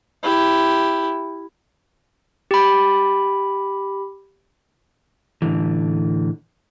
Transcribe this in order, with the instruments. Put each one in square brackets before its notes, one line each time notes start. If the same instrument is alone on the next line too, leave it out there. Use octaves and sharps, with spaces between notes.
[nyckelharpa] E4 G4
[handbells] G4 B5
[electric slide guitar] A2 D3 E3